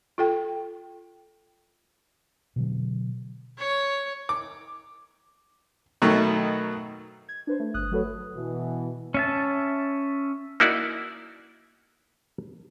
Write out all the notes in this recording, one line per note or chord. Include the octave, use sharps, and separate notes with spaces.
F4 A4 G5
B2 D3 F#3
C#5
D6
B2 D#3 F#3 A3
G#6
D4 B4 C5
A3
G1 D#6 F#6
F#3 A3 F#4 A4 B4 C#5
B2 E3
C#4 E5 A5
A#3 D#4 E4 F#4 D5